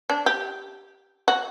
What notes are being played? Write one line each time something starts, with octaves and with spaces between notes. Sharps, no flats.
D4
G4
F#4